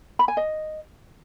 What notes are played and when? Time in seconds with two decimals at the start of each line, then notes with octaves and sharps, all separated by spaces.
0.19 B5
0.28 G#5
0.37 D#5